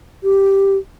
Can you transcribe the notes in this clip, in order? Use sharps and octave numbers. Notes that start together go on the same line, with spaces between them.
G4